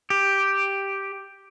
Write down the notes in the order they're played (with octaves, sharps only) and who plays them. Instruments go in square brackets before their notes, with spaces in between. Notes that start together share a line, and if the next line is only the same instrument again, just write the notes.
[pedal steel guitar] G4